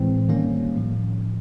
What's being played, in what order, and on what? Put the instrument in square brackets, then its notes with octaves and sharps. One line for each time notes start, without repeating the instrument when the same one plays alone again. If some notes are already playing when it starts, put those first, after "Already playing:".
Already playing: [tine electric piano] A2 E3 G#3 C4
D#3 G3 A#3 C#4
A2 F3